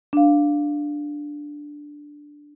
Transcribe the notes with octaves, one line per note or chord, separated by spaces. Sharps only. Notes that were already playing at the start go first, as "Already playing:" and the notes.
D4 F5